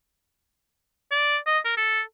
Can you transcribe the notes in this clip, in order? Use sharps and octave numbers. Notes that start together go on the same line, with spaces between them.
D5
D#5
A#4
A4